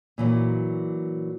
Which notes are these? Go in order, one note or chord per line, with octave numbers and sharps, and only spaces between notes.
A#2 E3 F#3